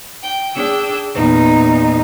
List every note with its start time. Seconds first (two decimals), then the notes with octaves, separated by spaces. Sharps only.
0.22 G5
0.55 D4 G#4 G5 E6
1.15 E2 A#2 D#4